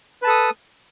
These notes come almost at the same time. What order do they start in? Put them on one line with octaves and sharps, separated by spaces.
B4 A5 A4 D#6